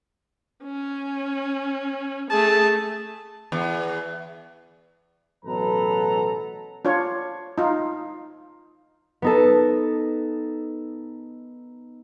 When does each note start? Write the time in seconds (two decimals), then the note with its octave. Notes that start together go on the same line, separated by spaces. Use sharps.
0.64 C#4
2.31 A3 G#4 A5
3.52 E2
5.44 A1 B2 F#3 A4 B4 A#5
6.85 D4 F4 C#5
7.58 D#4 F4
9.22 B3 D#4 A4